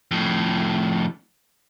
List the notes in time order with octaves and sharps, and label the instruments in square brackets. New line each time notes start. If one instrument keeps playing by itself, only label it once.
[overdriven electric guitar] F2 A2